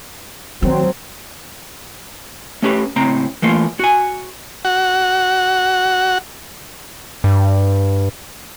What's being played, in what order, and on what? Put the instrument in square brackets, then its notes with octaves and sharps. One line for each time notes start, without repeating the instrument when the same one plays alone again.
[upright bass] D#3 [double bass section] F#3 C4
[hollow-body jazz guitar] A3 C#4 G4 B4
A2 C#3 C4 A#5
E3 A3 A#3 F4
F#4 G#5
[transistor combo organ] F#4 F#5
[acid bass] G2